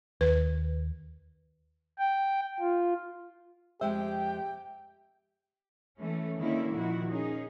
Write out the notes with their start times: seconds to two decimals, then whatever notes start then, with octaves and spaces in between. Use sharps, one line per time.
0.21 D#2 B4
1.99 G5
2.60 F4
3.81 F2 G#3 G4 C5 E5 G5
5.99 E3 A3 C#4
6.39 D3 D#3 A3 A#3 C#4 E4
6.73 A#2 D#3 F3 E4 F#4
7.10 C#4 D#4 G#4